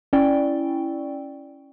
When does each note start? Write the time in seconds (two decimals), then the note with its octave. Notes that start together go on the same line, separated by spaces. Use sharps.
0.13 C#4 E4 D5 G5